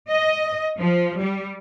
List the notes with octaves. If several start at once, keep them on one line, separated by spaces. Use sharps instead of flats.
D#5
F3
G3